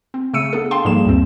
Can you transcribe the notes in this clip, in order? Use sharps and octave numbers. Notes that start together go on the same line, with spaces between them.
C4
C#3 A3 E6 C#7 D#7
B3 D4 G#4 A4
F5 G5 A5 C6
G#2 F3 G3 A#3 G#4 E7
D2 G2 C4